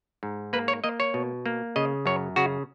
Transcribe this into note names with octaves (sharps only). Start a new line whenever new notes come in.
G#2
A#3 B4
C#5
A#3 D#5
C#5
B2
A#3
C#3 D#5
F#2 C#5
C#3 F#4